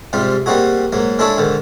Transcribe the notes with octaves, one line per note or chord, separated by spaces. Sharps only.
G#2 C3 G3 F4
G3 A#3 C4 D#4 F#4 G#4
G#2 F#3 A#3
G#3 D4 E4 G#4 A4 C#5
G#2 D3 D#3